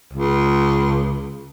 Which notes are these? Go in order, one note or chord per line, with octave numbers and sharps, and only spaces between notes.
C#2